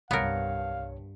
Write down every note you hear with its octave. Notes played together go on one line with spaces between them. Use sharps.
C2 G2 B3 A#4 C#5 F5 C#7